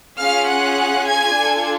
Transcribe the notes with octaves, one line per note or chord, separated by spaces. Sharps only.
C#4 F4 G#4 F5 F6
F#5 F#6
G#5 G#6
D4 F4 A4